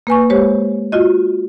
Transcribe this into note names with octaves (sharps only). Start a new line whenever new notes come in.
A#3 B4 G#5 C#6
G#3 G4 C5 C#5
F4 F#4 D#5